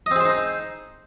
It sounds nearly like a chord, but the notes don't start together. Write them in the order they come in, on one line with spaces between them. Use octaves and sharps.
D#5 C4 G#4 C5 D#4